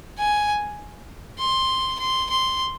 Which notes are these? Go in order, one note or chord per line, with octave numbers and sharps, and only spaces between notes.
G#5
C6
C6
C6